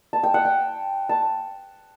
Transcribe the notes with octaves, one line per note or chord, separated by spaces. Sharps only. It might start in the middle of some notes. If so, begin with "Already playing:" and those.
A5
G5
F#5
G5
A5